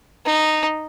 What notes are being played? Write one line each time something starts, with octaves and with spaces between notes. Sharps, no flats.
D#4